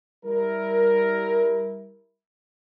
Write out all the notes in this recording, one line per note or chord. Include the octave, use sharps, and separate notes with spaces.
G3 E4 A#4